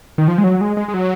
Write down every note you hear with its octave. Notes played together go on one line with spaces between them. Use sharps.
D#3
F3
G#3
F#3
G#3
G#3
G#3
F#3